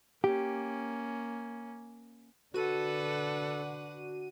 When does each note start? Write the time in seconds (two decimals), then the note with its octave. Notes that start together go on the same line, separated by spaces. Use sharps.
0.24 A#3 C#4 G4
2.54 D3 D4 F#4 A4 B4 F#5 D#7